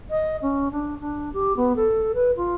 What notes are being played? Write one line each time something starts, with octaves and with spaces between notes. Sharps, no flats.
D#5
C#4
D4
D4
G4
B3
A4
B4
F4